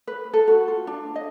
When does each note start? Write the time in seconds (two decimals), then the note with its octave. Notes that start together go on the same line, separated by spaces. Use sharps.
0.07 B4
0.33 A4
0.48 F#4
0.68 F4
0.87 D4
1.16 D#5